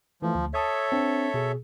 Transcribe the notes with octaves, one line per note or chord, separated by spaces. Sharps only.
E3 F3 A3
D2
A4 C#5 E5 A5 D#6 G#6
C4 D4
B2 G#4